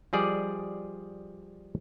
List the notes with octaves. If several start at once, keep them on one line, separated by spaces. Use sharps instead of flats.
F3 G3 G#4 D5 D#5